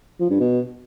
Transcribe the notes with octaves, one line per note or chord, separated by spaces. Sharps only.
F3
G2
B2